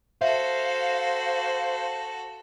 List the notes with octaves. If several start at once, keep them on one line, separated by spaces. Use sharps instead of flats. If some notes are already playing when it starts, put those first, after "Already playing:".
F#4 A4 C5 E5 F5